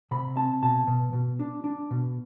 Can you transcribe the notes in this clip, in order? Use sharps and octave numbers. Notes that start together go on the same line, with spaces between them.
C3 B5
C4 A5
B2 A5
B2
B2
D4
D4
B2